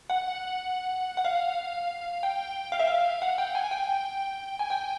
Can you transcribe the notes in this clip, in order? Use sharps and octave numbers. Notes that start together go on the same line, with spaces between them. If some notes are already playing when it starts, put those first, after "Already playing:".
F#5
F#5
F5
G5
F5
E5
F5
F#5
G5
G#5
G5
G#5
G5